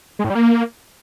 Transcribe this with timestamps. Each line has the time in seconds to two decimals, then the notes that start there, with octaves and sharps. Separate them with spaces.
0.19 G#3
0.24 A2
0.30 G3
0.35 A#3